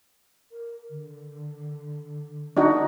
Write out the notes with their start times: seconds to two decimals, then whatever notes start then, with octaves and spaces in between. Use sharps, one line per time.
0.51 A#4
0.90 D3
2.57 D4 D#4 F#4